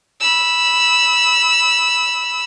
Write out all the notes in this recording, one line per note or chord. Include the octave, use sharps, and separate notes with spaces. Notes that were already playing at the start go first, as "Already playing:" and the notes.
B5 E6